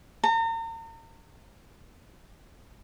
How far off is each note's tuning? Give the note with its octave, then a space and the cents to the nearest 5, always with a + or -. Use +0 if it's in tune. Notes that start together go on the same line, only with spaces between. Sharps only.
A#5 -40